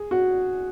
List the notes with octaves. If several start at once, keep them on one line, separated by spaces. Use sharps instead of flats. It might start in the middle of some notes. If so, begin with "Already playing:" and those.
Already playing: G#4
F#4